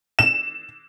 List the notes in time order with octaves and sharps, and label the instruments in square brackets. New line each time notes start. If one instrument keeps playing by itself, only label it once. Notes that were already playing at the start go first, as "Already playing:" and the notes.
[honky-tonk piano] E7